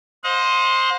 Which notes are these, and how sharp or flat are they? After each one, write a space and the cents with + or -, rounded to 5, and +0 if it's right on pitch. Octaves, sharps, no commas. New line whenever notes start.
C5 +0 D#5 +15 F#5 -45